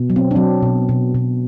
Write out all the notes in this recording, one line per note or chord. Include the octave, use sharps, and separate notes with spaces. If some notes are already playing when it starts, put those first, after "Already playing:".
Already playing: B2
F#3
C4
D4
F#3 C4
B2
B2
B2